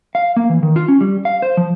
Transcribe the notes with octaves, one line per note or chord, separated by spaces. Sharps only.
F5
A#3
E3
D#3
F4
C#4
G3
F5
C5
F3